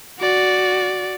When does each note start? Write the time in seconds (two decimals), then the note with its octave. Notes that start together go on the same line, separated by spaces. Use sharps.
0.19 F#4 D5